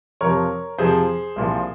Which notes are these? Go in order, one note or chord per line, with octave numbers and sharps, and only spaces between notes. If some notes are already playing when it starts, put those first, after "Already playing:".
F2 C3 F3 A#4 C#5
F2 C3 F3 G#4 C5
C2 A#2 F3